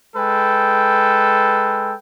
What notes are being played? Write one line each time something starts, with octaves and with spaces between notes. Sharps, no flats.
G#3 A4 B4 G5